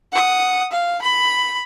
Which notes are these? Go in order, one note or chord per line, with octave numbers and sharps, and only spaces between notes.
F#5 D#6
F5
B5